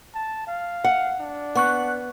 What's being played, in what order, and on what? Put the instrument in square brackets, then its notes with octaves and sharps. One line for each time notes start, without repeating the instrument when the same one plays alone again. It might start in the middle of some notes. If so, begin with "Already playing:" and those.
[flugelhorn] A5
F5
[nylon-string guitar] F#5
[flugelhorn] D4
[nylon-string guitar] B3 [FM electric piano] F#5 C#6 F#6